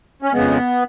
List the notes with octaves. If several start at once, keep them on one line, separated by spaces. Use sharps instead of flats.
C#4
F2 C#3 G#3 B3